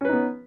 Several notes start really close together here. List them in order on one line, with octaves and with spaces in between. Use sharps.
C#4 B4 D#4 B3